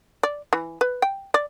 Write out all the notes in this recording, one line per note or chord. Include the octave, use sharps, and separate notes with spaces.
D5
E3
B4
G5
D5